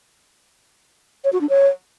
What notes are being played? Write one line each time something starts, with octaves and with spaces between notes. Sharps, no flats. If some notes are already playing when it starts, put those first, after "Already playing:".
C#5
F#4
D4
C#5